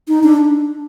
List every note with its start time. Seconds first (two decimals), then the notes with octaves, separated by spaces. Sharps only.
0.08 D#4
0.23 D4